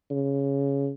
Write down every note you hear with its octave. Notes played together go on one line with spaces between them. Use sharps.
C#3